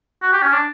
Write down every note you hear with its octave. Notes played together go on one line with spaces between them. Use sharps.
F#4
G4
C#4
D4